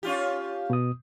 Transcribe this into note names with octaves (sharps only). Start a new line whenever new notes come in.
C#4 F4 G4
B2 D#6